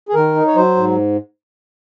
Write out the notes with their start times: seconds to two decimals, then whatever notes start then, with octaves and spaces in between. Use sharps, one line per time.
0.09 G#4
0.14 D#3 A#4
0.35 D#4
0.47 C#5
0.55 F#3 C5
0.76 G#2